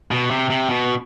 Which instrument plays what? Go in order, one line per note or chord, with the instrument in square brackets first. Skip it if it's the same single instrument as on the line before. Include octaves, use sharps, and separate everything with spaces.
[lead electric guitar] B2
C3
C3
B2